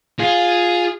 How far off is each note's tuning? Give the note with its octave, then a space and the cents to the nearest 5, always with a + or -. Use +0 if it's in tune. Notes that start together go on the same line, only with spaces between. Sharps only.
F4 +10 G#4 +0